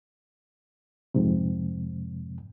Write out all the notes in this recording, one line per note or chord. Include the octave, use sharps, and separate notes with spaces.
F2 G#2 C3